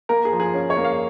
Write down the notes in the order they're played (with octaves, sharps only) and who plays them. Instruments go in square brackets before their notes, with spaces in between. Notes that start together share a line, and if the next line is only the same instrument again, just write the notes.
[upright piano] A#3 A#4
G#4
F3
G#4
C#4
C#5
A#3
F5